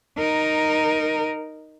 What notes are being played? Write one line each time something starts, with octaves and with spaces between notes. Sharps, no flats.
D#4 A#4